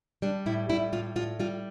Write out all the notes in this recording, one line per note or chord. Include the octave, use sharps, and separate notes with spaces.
G3 D4
A2 E4
G3 E4
A2 F4
A2 F4
G3 F4